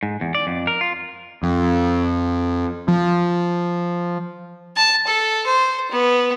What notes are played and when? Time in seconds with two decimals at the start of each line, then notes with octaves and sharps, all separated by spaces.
0.03 G#2
0.21 E2
0.35 D5
0.47 F2
0.67 A#4
0.81 F4
1.43 F2
2.88 F3
4.77 A5
5.07 A4
5.46 C5
5.91 B3